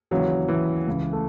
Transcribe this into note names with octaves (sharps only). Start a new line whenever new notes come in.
D#2 C#3 E3 F#3
E3
C#2 C#3 E3
A3